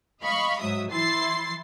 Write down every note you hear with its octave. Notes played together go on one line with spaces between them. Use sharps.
D#5 F5 B5 C#6
G#2 F#3 E5 D#6
E3 E4 C6 A6 C7